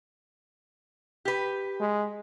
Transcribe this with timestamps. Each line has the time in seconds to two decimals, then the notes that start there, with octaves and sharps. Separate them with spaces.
1.25 G4 B4
1.80 G#3